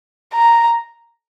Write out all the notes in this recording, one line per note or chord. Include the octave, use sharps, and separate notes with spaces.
A#5